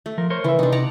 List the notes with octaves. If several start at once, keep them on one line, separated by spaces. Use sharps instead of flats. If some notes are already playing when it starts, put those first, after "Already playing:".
A3
F3 A#4
A#4 C5 C#5
C#3 E3 E5
C3 D4 D#4
D5 F#5 A#5